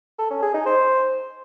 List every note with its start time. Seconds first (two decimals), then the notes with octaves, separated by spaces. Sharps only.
0.19 A4
0.30 C#4
0.42 G#4
0.54 D#4
0.66 C5